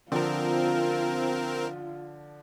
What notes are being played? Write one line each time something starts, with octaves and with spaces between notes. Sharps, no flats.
D3 F3 C4 F4 A#4